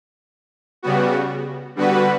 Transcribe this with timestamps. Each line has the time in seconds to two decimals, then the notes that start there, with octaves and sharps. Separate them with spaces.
0.82 C#3 G3 B3 F#4
1.76 D3 G3 B3 F#4 B4